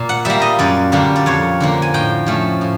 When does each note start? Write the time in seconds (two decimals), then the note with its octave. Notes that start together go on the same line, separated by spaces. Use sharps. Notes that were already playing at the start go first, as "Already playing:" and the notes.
Already playing: A#2
0.09 F#5
0.25 G3 A#3 E5
0.42 D#5
0.59 F#2 D5
0.92 D3 G3 A#3 D4
1.16 D5
1.26 F2 C#5
1.60 D3 F3 A#3
1.82 G#5
1.94 A2 G5
2.26 F3 A3 C#4
2.61 A2